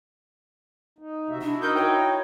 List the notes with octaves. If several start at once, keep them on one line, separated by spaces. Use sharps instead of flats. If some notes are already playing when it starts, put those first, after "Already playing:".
D#4
C3 F#4 E5
D4 E4 F#4
D#4 A#4 G6
C#5 G5